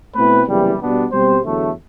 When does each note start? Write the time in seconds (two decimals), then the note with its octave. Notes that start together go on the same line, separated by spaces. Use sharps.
0.15 B2 A3 C4 E4 B4
0.47 F#1 E2 C3 E3 G3
0.80 B2 G3 B3 D4
1.12 B2 G3 C4 G4 C5
1.44 E2 D3 F#3 A3